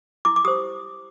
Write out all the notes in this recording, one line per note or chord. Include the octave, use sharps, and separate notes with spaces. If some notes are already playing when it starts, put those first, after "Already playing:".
E4 D6
D6
G4 C5 D#6